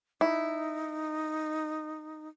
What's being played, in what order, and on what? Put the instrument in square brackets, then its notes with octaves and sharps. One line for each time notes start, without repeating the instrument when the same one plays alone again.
[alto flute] D#4 [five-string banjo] E4